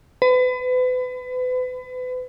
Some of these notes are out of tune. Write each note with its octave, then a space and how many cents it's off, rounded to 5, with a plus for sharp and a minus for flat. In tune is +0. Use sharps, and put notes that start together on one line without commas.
B4 +35